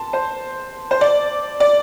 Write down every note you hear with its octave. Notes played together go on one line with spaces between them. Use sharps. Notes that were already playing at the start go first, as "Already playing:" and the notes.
Already playing: A5 C6
C5
C5
D5
D5